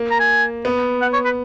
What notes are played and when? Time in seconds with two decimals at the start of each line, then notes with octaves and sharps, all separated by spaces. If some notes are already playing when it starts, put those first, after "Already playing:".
Already playing: A#3
0.11 A#5
0.20 G#5
0.65 B3
1.02 F#5
1.13 C#5
1.25 B4